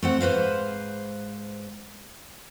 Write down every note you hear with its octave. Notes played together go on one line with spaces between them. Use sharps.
A3 C4 F#5
G#2 B4 C5 F5